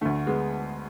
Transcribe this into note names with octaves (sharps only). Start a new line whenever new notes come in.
D2 D3 A3
G#3 B3